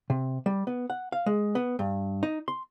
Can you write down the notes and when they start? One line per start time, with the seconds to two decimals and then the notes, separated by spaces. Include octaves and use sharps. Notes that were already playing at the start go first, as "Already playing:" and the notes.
0.10 C3
0.46 G3
0.67 B3
0.90 F#5
1.12 F5
1.26 G#3
1.55 B3
1.79 G2
2.23 D#4
2.48 C6